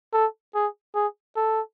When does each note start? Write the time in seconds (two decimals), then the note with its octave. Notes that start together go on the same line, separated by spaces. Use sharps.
0.14 A4
0.55 G#4
0.95 G#4
1.36 A4